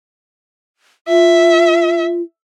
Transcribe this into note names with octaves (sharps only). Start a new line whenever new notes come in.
F4 E5